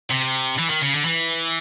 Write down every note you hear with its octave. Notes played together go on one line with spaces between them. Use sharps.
C3
E3
D#3
C#3
D3
E3